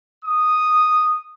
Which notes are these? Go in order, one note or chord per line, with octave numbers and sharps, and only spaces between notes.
D#6